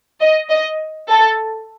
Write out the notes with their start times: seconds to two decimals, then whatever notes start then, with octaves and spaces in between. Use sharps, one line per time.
0.20 D#5
0.50 D#5
1.09 A4